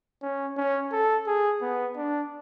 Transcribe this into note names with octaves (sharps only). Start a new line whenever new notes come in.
C#4
C#4
A4
G#4
B3
D4